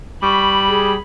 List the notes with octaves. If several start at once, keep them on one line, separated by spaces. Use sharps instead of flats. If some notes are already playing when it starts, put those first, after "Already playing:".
G3 B5 C#6
G#4